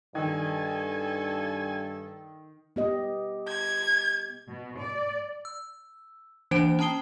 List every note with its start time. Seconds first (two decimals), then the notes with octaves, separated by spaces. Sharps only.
0.15 G2 D#3 A4 G#5
2.76 B3 G4 D#5
3.48 G#6
4.48 B2
4.78 D5
5.45 E6
6.51 E3 A#3 D4 C5 G5 D7
6.79 C#4 G5 A#5 D#6 C7 G7